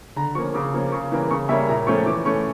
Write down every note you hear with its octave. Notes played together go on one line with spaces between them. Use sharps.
D3 A#5
F3 A#3 C#4 C#6
C#3 D6
F3 A#3 C#4
C#3 C#6
E3 G3 A#3 C#4
C#3 C#6
G3 A#3 C#4 E5
A#2 A#5
F3 A3 C#4 C#6
E3 D6
A3 C#4 C#6